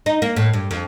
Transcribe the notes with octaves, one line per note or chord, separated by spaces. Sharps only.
D#4
A#3
A2
G2
F2